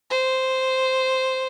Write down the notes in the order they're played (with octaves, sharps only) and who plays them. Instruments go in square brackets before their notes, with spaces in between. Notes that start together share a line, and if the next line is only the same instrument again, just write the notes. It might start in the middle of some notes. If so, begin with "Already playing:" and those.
[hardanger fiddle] C5